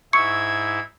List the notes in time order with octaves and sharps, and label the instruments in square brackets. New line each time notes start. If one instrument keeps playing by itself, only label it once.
[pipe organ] G#2 E4 [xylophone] C#6 C#7 [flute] E6 [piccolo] G#6